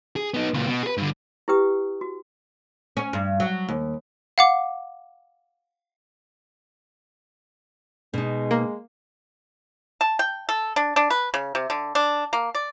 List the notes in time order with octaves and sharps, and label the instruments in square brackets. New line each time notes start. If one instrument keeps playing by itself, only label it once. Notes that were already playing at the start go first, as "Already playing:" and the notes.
[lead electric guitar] G#4
B3 D#4
C#2 A#2
B2
G#4 B4
G2 D3
[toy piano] E4 G4 B4 G5 D#6
F#4
[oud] C#4
G2
F#3
D#2
[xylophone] F5 F#5 D6
[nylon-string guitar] B2 D#4 [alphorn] G#3
[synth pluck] A#3
[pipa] A5
G5
A4
D4
D4
B4
C#3
C3
D3
D4
A#3
D5